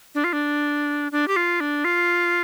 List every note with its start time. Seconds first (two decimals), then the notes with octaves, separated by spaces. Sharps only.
0.15 D4
0.24 F4
0.33 D4
1.12 D4
1.28 G4
1.36 F4
1.60 D4
1.85 F4